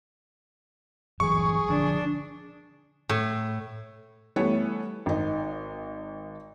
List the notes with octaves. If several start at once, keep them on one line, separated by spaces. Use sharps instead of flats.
G1 E3 F#3 G#4 C#6
D3 F3 D4
A2
E3 G3 A3 B3 A4 C#5
G#1 D#4